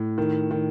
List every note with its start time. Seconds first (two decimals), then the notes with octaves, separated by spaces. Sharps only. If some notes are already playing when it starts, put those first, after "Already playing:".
Already playing: A2
0.18 D#3
0.51 D#3